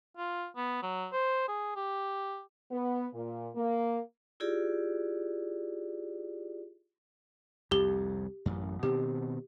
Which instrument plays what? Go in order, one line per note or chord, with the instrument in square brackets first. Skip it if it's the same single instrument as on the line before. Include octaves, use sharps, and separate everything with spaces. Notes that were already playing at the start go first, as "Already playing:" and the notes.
[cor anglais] F4
B3
F#3
C5
G#4
G4
[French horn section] B3
A#2
A#3
[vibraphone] E4 F4 G4 G#4 D5
[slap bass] C2 F2 [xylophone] G4 G7
[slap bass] A1 F#2
[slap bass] B2 D#3 C4 [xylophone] G4